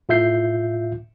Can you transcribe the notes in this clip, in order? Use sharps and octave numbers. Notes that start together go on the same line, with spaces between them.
A2 F4 E5 G6 C7